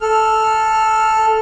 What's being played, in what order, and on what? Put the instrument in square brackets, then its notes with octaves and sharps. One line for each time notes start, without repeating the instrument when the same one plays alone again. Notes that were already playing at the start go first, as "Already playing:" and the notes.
[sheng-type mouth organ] A4 F6